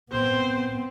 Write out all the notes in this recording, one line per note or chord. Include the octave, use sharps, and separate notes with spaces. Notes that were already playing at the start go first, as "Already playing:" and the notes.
B3 C4 C5